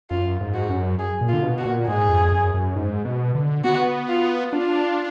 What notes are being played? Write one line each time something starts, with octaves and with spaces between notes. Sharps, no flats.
F#2 F4
G#2
F#4
F#2
G#4
A#2
F4
D3
B2
F#4
A#2
G#2 G#4
F2
F#2
F#2
G#2
B2
D3
B3 F#4
F4
D4 F4